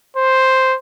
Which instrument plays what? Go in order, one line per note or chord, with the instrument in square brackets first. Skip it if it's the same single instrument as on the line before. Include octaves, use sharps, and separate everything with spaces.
[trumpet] C5